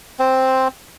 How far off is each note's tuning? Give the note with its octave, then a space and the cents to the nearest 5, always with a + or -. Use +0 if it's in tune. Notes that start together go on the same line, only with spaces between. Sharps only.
C4 +0 C5 +0